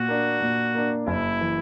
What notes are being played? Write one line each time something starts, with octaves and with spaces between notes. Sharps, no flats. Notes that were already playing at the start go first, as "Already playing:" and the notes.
Already playing: A#2 F#4
A#3 D4
A#2
A#3 D4
F#1 E4
E3